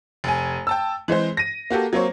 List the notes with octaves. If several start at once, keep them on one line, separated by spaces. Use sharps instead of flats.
F1 G#5
G5 A5 E6
E3 G#3 C4 C5
A#6 D#7
A#3 F#4 G4 A4
F#3 A#3 C4 C#5